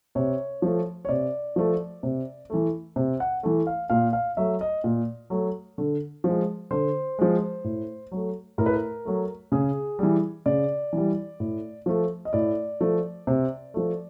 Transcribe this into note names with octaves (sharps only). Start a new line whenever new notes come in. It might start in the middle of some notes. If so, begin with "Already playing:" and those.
C3 C#5
F3 A3
C#5
C3 D5
F3 A3
C3
E3 A3
C3
F#5
E3 A3
F5
A#2 F5
F5
F#3 A3 E5
D#5
A#2
F#3 A3
D3
F3 G#3
D3 C5
F3 G#3
A2
F#3 A3
A2 A#4
B4
A#4
F#3 A3
C#3 G#4
E3 G3
C#3 D5
E3
G3
A2
F3 A3
D#5
A2 D5
F3 A3
C3
F3 A3